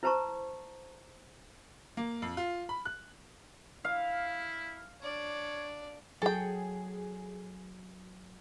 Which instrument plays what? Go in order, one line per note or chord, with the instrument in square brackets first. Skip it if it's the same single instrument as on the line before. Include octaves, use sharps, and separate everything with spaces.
[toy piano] E4 B4 C5 A5 A#5 C#6
[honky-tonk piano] A#3
F2
F4
B5
F#6
[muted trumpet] E4 [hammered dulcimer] F5
[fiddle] D4 D5 [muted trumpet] C#5
[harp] F#3 C#7 [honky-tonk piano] G#4 [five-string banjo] A4 G5